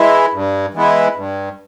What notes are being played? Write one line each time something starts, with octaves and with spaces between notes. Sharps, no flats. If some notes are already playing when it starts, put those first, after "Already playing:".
Already playing: E3 G#3 E4
G2
E3 G#3 B3 E4
G2